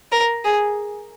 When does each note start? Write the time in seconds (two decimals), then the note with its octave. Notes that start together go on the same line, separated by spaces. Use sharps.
0.12 A#4
0.45 G#4